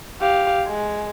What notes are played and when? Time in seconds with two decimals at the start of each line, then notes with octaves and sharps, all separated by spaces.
0.21 G4 F5
0.67 G#3